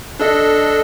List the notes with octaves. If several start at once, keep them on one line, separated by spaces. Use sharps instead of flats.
D4 A4 D#5